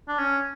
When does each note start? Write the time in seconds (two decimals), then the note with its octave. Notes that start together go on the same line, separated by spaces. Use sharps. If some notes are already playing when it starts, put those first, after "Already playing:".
0.08 D4
0.19 C#4